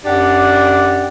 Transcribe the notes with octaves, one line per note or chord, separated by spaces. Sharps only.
F#2 D4 G4 D5 F#5 G5